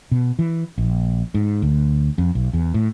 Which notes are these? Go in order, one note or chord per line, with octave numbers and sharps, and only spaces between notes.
B2
E3
A#1
G#2
D2
F2
B1
E2
A2